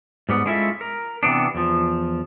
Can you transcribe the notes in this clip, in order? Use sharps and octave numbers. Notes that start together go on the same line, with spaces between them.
G#2 G3 B3
G#3 C#4 E4 F4 A4 E5
A#4
C3 E3 B3 D4
E2 F3